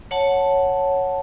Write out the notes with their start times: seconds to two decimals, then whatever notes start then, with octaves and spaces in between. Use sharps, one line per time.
0.11 C#5 F#5 A5